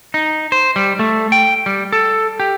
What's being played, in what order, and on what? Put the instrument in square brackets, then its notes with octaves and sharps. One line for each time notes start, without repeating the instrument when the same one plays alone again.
[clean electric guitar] D#4
C5
G3
A3
G5
G3
A4
G4